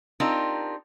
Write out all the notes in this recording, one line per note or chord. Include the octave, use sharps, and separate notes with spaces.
C4 D4 D#4 F4 G4 A#4